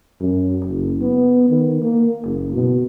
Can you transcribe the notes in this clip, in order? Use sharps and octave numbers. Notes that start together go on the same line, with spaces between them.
F#2
F#1
B3
D#3
A#3
F#1
B2